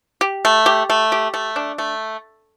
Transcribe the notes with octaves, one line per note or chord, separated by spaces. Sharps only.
G4
A3
G4
A3
G4
A3
D4
A3